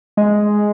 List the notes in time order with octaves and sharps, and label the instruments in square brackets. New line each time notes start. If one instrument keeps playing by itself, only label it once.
[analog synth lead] G#3